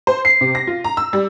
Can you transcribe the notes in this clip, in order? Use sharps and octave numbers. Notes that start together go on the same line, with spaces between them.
C5
C7
C3
A#6
F4
A#5
E6
G3